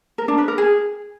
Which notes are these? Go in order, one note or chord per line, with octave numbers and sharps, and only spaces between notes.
A#4
D4
B4
A#4
G#4